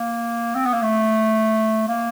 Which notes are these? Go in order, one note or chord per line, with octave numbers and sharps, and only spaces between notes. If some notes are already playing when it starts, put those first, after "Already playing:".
Already playing: A#3
C4
B3
A#3
A3
A#3